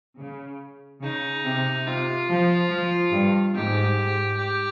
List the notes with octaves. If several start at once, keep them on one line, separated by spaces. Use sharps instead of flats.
C#3
C#3 D#4
C3
C3 F4
F3
F3
G2
G#2 G4
G4